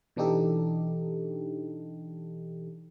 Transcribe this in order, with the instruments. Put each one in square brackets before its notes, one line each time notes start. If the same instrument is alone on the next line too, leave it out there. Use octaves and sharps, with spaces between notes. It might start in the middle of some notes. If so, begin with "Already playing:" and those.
[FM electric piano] B2 E3 D4 D#4 G4 A4